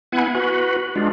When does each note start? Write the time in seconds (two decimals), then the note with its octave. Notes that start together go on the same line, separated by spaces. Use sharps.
0.12 B3 E4 F#5 G#5
0.35 F#4 B4
0.96 G#3 D4 F4